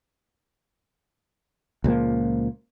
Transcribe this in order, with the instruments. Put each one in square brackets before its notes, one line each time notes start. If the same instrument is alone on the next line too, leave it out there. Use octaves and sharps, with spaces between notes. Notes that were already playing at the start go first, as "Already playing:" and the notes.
[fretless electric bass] C#2 A#2 F3 A#3